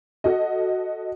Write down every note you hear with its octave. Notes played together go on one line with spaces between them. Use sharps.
F#4 A4 D#5